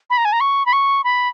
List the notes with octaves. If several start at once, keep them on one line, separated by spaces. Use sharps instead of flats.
B5
A#5
G#5
A#5
C#6
B5
C#6
B5